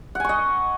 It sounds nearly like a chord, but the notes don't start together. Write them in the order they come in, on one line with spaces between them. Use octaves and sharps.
F#5 G#5 C#6 D#5